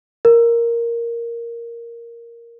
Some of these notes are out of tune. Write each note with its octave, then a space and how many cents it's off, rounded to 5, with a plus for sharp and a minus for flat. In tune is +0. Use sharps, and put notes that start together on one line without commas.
A#4 +0